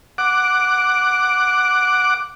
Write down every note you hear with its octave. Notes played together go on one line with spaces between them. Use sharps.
F#5 D6